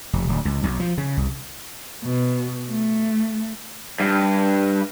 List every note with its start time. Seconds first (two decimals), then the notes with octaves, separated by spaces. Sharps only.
0.13 F1
0.29 D1
0.45 C#2
0.63 B1
0.80 F3
0.98 C#3
1.17 C2
2.04 B2
2.70 A3
4.00 G2